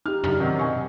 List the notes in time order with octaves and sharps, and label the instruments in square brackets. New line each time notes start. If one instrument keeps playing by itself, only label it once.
[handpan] D#4 G4 [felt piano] F6
[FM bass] F#2 [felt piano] C#3 [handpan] D4
[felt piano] C3 D#3 F#3
[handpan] B2 [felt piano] D#5 G#5 C#6